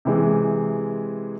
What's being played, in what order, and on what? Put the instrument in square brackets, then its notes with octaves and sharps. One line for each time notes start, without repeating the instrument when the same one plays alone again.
[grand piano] C3 E3 G#3